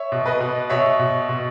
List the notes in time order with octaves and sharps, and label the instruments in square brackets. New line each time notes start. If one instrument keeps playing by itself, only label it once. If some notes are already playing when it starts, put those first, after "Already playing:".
Already playing: [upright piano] C#5 E5
B2
B4 D#5
B2
B2 C#5 E5
B2
B2